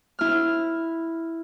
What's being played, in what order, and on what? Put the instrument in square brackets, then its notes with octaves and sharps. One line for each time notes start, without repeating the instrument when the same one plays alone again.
[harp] E4 F6